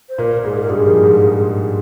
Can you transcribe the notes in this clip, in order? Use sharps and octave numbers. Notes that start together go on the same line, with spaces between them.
C5
A#2 A#3 A#4
G#2 G#3 G#4
A#4
G2 G3 G#4
F3
G#2 G#3